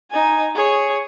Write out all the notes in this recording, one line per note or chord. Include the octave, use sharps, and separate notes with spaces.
D#4 G#5
G#4 C#5